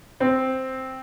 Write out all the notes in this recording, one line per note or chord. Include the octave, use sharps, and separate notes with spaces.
C4